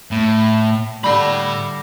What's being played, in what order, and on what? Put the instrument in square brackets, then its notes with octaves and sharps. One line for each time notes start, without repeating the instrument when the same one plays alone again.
[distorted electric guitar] A2
[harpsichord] D3 G3 [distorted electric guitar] A4 B5